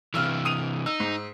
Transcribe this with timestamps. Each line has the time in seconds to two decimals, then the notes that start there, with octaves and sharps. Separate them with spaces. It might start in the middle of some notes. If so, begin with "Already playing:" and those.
0.14 B1 C3 E3 E6 F6
0.45 D#6 D#7 F7
0.86 D#4 E6
1.00 G#2